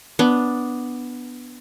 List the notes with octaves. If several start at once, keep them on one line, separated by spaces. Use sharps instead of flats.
B3 D4